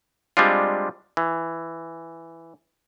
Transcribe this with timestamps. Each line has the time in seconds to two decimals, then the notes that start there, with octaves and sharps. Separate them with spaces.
0.37 G3 G#3 C4 D4 F4
1.17 E3